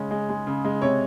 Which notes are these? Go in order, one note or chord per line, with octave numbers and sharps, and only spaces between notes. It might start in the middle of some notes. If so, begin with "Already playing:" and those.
Already playing: C#3 G#3 C#4
G#3
G#3
C#3
G#3
C3 C#5